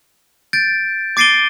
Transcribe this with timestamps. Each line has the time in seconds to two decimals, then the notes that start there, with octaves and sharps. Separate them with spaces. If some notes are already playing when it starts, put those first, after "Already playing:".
0.53 G6 A6 D7
1.17 D6 A6 C7 D7 D#7 G7